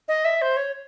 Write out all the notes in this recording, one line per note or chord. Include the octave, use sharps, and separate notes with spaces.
D#5
E5
C5
C#5